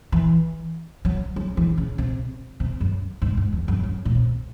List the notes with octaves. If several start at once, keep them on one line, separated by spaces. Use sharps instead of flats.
E3
F#3
F#3
E3
C#3
C3
C3
F#2
G#2
G#2
E2
F#2
F#2
A2
C3